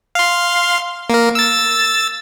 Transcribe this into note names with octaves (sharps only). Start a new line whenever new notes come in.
F5 C6
A#3 A#4
E6 A6